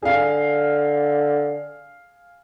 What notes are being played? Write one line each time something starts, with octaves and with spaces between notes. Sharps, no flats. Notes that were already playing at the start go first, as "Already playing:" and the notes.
D3 G#4 F5